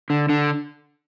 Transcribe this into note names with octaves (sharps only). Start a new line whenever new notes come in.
D3
D3